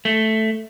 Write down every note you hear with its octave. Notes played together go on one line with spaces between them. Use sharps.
A3